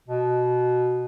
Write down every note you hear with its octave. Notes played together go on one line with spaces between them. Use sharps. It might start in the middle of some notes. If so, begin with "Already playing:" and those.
B2